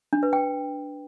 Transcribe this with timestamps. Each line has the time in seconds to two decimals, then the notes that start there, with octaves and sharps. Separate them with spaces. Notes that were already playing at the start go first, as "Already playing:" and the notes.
0.13 D4
0.23 B4
0.33 G5